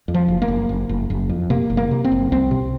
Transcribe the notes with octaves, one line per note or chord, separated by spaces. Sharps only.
F2
F3
F#1
A#3
F#1
F#1
F#1
F#1
F2
C3 A#3
F#1
A#3
C3
C4
F#1
C2 C4
C3